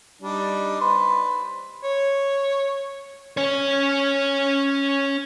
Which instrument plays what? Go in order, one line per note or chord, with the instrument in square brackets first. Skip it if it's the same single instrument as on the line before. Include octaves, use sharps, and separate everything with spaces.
[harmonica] G3 D4 D#4
B4 C5
[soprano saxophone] C#5
[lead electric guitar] C#4 C#5